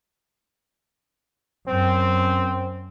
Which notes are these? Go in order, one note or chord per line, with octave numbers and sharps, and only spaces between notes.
F#2 C4